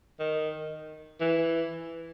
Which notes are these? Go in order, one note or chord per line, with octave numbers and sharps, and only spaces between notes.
D#3
E3